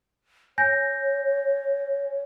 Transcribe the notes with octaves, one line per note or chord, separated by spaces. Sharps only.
C#5 G#5 G6 A#6